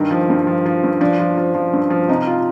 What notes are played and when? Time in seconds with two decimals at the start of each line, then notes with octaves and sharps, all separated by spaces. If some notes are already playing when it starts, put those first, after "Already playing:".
Already playing: G2 D#3
0.11 F3
0.30 G2
0.47 F3
0.66 F3
0.84 G2
1.01 F3 D4
1.19 F3
1.38 F3
1.55 F3
1.73 G2
1.90 F3
2.08 C3 D#4
2.26 F4